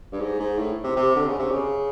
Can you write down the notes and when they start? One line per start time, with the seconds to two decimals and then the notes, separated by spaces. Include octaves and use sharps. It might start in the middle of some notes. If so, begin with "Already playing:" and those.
0.12 G2
0.20 G#2
0.39 G#2
0.58 A2
0.84 C3
0.96 C3
1.16 D3
1.27 C#3
1.39 C3
1.51 C#3